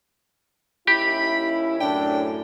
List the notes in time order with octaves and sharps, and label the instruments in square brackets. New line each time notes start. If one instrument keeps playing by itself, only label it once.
[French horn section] D#2 C#4 E4 [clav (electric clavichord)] G4 [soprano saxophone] B5
[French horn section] F#2 A2 [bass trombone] D4 [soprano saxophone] G5